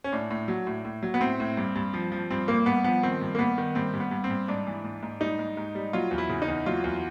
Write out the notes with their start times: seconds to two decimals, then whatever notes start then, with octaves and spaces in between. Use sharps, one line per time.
0.04 C#4
0.12 A2 D4
0.31 A2
0.48 F#3
0.67 A2
0.85 A2
1.03 F#3
1.14 B3
1.21 A2 C4
1.40 A2
1.57 G2
1.76 G2
1.94 F3
2.12 F3
2.30 G2 C4
2.48 G2 A#3
2.66 G2 B3
2.84 F3 B3
3.03 D#3 C4
3.21 G2
3.35 A#3
3.39 G2 B3
3.58 D#3
3.75 G2 C4
3.94 G2
4.00 B3
4.11 G2
4.24 C4
4.30 G2
4.48 G#2 D4
4.67 E3
4.84 G#2
5.03 G#2
5.20 G3 D#4
5.39 G#2
5.57 G#2
5.75 G3
5.93 F#3 F4
6.11 E2
6.18 E4
6.29 C#3
6.42 D#4
6.48 E2
6.66 F#3 F4
6.84 E2